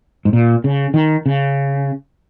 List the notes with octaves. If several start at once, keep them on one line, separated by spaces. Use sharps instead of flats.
G#2
A#2
C#3
D#3
C#3